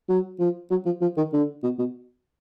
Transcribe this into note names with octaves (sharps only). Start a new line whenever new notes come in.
F#3
F3
F#3
F3
F3
D#3
D3
B2
B2